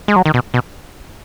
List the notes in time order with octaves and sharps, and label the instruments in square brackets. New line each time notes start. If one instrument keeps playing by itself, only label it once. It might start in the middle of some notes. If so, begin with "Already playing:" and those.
[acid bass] G#3
F#3
D#3
B2
B2